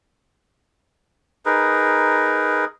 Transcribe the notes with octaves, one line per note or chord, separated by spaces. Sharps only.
D#4 G#4 A#4 B4